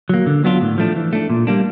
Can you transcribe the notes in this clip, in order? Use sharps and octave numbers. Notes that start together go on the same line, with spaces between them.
F#3 A#3
D3
F#3 B3 D4 F4
A2
F3 A3 D4
E3
A3 D4
A#2
G3 A#3 D4